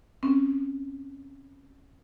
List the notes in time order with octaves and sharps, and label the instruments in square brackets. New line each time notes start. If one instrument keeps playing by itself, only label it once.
[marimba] C4 C#4